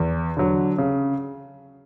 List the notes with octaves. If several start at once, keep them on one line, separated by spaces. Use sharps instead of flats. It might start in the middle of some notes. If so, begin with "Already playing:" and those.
Already playing: E2
D3 F#3
C#3